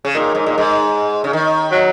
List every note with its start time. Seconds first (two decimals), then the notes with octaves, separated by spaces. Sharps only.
0.05 C#3
0.15 A#2 D#3
0.35 G#2
0.46 A#2
0.58 G#2
1.24 C#3
1.33 D#3
1.71 F#3